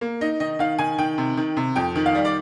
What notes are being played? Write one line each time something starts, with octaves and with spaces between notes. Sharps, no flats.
A#3
D#4 D#5
D#3 D#5
D#3 F5
D#3 G#5
D#3 G5
C3
D#3
C3
F2 G5
D#3
F5
G3
D5